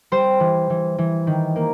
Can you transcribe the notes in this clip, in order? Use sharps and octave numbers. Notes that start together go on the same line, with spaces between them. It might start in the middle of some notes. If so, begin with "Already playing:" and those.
G3 C5
E3
E3
E3
D#3
A#3